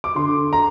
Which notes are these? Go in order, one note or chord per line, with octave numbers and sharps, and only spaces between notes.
D6
D3 C6
A#5